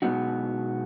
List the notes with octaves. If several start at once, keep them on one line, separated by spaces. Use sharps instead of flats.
B2 G#3 B3 D#4 F#4